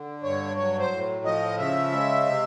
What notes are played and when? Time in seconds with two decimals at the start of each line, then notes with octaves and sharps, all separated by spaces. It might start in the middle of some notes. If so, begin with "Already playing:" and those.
Already playing: D3
0.23 G2 C#5
0.57 F#3 C#5
0.79 C5
0.91 A2
1.24 F3 D#5
1.58 C#3 E5
1.92 G#3
2.26 C3